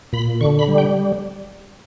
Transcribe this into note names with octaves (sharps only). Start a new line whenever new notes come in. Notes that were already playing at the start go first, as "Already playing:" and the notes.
A#2 B5
D3 C#6
B5
G3
G5